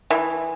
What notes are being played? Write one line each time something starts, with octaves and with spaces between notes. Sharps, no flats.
E3